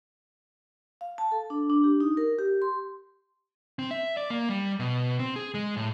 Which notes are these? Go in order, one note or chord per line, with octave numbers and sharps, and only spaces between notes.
F5
A5
A4
D4
D4
G4
D#4
A#4
G4
C6
C4
E5
D5
A#3
G3
B2
C4
G#4
G#3
A2